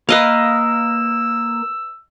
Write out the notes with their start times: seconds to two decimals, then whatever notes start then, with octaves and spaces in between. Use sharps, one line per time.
0.09 A#3 A#4 B4 D#5 F5 E6